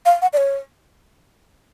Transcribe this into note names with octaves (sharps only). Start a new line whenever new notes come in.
F5
F#5
D5
C#5